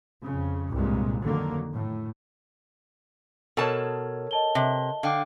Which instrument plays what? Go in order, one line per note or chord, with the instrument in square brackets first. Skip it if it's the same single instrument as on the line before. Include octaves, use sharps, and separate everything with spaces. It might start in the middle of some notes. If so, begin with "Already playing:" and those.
[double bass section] F2 C#3
C2 G2 A#2 G#3
F2 D3 D#3 F#3 A#3
A2
[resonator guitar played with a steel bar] B2 A5 [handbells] A4 A#4 C#5
[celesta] D#5 A5 G7
[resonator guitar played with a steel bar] C3
[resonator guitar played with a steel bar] D3 [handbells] F5 G5 D6